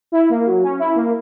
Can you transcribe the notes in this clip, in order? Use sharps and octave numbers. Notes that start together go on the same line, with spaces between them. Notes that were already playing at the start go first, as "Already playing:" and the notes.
E4
A#3
F#3
C#4
E4
A#3